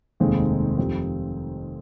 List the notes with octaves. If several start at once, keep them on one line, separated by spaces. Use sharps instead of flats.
F1 D#2 D#3 G#3 C4
F2 D#3 G3 C4